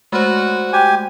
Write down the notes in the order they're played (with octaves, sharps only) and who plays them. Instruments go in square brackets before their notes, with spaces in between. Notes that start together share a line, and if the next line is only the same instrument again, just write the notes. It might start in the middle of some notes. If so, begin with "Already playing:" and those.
[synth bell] G#3 A3 C5 [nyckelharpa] F#4
[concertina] G4 G#5